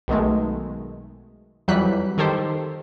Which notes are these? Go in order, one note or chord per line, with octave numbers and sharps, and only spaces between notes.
B1 B2 D#3 G#3 A3
F2 E3 F#3 G3 F#6 B6
D#3 G4 A4 C5